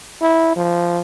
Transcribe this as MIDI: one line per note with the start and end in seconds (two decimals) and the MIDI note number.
0.22 0.53 64
0.56 1.01 53